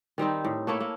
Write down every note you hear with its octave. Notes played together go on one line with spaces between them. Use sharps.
D#3 G3 C4 D#4
A2
A3 A#3 E4 C#5
A#3